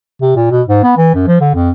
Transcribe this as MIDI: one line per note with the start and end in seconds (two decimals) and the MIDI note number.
0.21 0.31 48
0.36 0.50 46
0.51 0.62 47
0.68 0.79 44
0.83 0.96 59
0.97 1.14 52
1.14 1.23 42
1.27 1.37 53
1.40 1.53 50
1.55 1.70 41